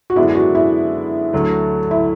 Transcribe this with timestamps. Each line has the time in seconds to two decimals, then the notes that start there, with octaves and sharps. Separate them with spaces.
0.10 F#4
0.16 F#2 D3 G#3 B3 D4 E4
0.35 F#4
0.55 E4
1.33 D2 D3 F#3 A3
1.91 E4